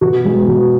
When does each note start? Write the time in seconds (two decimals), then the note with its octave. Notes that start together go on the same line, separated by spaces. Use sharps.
0.01 B2 F#4
0.25 G#3 B3
0.48 B2